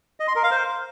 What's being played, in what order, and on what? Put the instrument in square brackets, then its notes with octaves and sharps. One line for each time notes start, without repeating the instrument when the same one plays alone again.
[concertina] D#5
C6
A#4
F5
C5